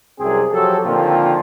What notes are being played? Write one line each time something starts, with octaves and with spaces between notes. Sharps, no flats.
C2 F#2 C3 C4 G#4
F3 F#3 G4 A4
A#2 D3 D#3 F3 C4 F4